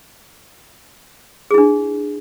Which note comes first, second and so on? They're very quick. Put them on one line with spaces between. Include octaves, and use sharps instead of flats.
G#4 E4 D4